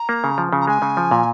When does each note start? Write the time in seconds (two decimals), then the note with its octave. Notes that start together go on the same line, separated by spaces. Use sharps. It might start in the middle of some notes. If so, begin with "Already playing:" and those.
Already playing: A#5
0.09 A#3
0.24 C#3
0.38 F3
0.53 C#3
0.61 A#5
0.67 G#3 G#5
0.82 C#3
0.97 F3
1.11 A#2